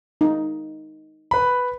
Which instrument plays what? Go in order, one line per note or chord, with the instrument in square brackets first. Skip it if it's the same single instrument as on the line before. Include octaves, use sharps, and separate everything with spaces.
[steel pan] D#4
[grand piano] B4 B5